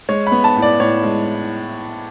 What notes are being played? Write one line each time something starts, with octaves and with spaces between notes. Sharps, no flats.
G#3 C#5
B5
B3
A5
A2
D5
A2 C#5
G#3